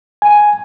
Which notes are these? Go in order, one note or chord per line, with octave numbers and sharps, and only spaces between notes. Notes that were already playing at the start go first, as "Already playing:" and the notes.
G#5